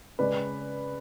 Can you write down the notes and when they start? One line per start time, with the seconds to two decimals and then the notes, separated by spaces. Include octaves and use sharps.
0.19 C#3 G#3 C#4 B4 D5